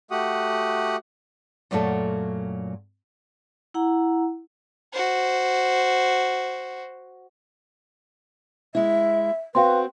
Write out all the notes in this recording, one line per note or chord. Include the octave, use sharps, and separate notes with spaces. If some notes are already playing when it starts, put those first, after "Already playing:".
A3 F#4 G4 F#5 D#6
F#2 A#2 F#3 A3 A4
E4 F#5 A#5
F#4 C5
G#3 E4 E5
C4 F#4 B4 F5 G5 C6